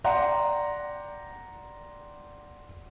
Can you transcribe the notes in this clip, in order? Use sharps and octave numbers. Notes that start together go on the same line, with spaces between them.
D5 F#5 G5 A#5 C6